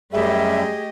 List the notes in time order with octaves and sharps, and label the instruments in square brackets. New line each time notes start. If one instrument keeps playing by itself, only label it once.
[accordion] F#2 G3 [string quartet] A3 G4 D#5 [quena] G#4 [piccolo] E5